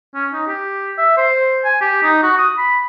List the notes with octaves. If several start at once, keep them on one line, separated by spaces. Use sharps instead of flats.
C#4
D#4
G4
E5
C5
G#5
G4
D#4
F#4
D#6
B5